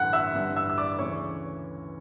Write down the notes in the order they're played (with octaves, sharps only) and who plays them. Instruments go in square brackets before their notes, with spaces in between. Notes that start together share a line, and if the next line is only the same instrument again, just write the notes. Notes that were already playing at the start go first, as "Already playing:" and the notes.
Already playing: [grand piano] A1 G2 D3 F#5 F#6
E5 E6
A1 G2 D3
E5 E6
E6
D5 D6
D2 C#3 E3 C#5 C#6